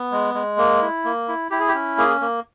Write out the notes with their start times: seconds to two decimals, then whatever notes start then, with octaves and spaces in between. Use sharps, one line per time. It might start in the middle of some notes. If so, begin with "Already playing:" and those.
Already playing: B3
0.12 G#3
0.34 G#3
0.57 A#3
0.82 E4
1.04 A#3
1.28 E4
1.50 E4 G4
1.60 G#4
1.68 G4
1.74 C#4
1.98 A#3 G#4
2.21 A#3